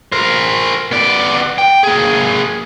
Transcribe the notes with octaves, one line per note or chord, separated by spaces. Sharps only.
A#4 C5
B3 D5
G5
A#3 G#4